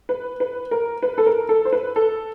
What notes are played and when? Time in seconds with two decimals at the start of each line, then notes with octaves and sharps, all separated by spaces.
0.09 B4
0.40 B4
0.71 A#4
1.02 B4
1.18 A4
1.26 A#4
1.49 A4
1.65 C5
1.73 B4
1.96 A4